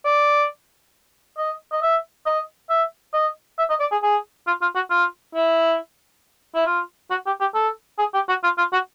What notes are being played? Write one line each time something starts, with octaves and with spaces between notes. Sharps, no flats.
D5
D#5
D#5
E5
D#5
E5
D#5
E5
D#5
D5
G#4
G#4
F4
F4
F#4
F4
E4
E4
F4
F#4
G4
G4
A4
G#4
G4
F#4
F4
F4
F#4